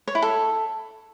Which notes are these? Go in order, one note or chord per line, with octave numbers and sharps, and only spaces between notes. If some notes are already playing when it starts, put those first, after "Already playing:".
C#5
E4
A4